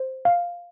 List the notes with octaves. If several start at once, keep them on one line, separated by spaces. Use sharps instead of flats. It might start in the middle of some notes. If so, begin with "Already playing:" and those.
Already playing: C5
F5